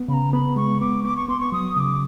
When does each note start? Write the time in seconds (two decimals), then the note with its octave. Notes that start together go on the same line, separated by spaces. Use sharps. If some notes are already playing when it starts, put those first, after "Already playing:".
Already playing: B3
0.08 C#3 B5
0.13 A#5
0.33 B3 B5
0.56 G#3 C#6
0.81 B3 D6
1.04 B3 D6
1.17 C#6
1.28 B3 C6
1.40 C#6
1.52 F#3 D#6
1.76 C#3 D6 D#6